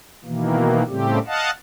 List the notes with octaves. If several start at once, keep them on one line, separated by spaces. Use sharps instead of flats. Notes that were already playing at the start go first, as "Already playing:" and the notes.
B2 D#3 E3 A#3
A2 C#3 G3 A3 C4 G4
D#5 F5 F#5 A5